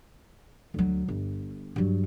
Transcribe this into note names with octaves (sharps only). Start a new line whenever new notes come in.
D2 F#3
G1
G2 F#3